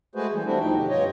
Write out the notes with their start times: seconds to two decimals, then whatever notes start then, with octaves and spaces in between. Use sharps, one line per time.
0.15 G#3 A3 F#4 G#4 B4 C5
0.32 E3 G3
0.45 G3 A3 C4 D4 E4 F#4
0.60 E2 B2 F3 D#4 G5
0.76 D3 G4
0.89 G2 F4 C#5 D#5 G5